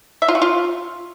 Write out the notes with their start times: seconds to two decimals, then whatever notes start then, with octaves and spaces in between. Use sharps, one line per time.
0.22 E5
0.28 F4
0.35 F#4
0.42 F4